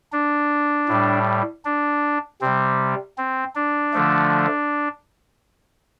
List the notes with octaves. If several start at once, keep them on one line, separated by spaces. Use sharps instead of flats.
D4
A2 G3
D4
C3 G3 C4
C4
D4
D3 F3 A3